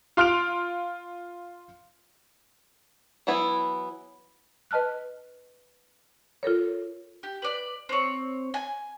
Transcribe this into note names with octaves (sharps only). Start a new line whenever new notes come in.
F4 C6 F6 D7 F7
E3 F#3 B3 E4
B4 D#5 A5 F6 F#6
F4 A4 A#4 C#5
G4
B4 D5
C4 C#5
G#5